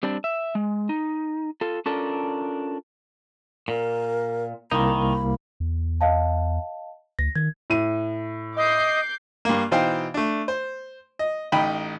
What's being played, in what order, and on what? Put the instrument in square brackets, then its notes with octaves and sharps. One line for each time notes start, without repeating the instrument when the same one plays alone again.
[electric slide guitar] G3 C4 D4
E5
G#3
D#4
F4 A4
C#4 D4 F4 A4 A#4
[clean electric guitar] A#2 [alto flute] A#4
[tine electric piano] C2 A#3 [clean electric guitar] D#3 D#4 [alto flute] B5
[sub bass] E2
[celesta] D#5 F5 A5
[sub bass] D2 [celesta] A#6
[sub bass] D#3 [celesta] G#6
[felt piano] A2 D#7
[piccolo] D#5 [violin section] D6 G6 C7
[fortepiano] G2 A#3
B2 E3 D#4 C5 F5 G5
A3 D4
C5
D#5
A1 D#4 G5 B5